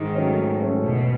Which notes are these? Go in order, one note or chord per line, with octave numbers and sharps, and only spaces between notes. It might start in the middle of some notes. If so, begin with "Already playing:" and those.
Already playing: G#2 D#3
F#3 A3 C#4
G#2
F#3 A3 C#4
E1 B2